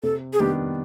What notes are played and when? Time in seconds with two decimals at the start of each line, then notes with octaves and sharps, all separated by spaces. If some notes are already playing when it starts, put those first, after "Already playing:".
0.03 C3 A4
0.33 G#4
0.40 D#3 G3 B3 D4 G4